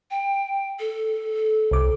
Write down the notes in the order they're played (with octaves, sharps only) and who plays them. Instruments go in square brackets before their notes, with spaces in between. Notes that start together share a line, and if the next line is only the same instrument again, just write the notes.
[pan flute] G5
A4
[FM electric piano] C2 D6